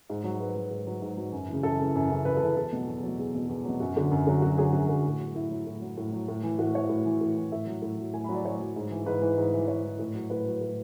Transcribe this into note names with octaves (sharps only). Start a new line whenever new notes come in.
G#2
F#3
G#2 B4
F#3
G#2
F#3
G#2
F#3
F#2
C#3 E3
F#2 A4
C#3 E3
F#2
C#3 E3
F#2 B4
A4
C#3 E3
E2 A4
B2 F#3
E2
B2 F#3
E2 G#4
B2 F#3
E2
B2 F#3
F#2 F#4
D3 F#3
F#2
D3 F#3
F#2 F#4
D3 F#3 G#4
F#2 F#4
D3 F#3
A2
F#3
A2 E4
F#3
A2
F#3
A2
F#3
A2
E3
A2 F#4
E3 C#5
A2
E3
A2
E3
A2 E5
F#3
A2
F#3
A2 G#5
B5
F#3
D5
A2 C#5
F#3
G#2
E3
G#2 B4
E3
G#2
E3
G#2 C#5
E3
A2
F#3
A2 B4
F#3
A2